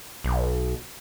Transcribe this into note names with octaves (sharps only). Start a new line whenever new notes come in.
B1